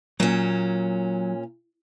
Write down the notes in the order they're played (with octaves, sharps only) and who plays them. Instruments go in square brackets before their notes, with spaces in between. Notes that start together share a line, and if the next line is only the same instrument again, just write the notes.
[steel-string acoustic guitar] A#2 C#4 [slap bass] F#3